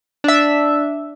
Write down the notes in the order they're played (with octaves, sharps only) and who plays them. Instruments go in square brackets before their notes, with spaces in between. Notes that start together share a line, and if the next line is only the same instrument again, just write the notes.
[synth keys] D4 E5